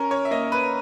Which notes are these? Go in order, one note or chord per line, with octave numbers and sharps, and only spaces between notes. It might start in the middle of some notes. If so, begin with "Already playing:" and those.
Already playing: C#4 A#4
C#5
E5
A#3 D#5
B4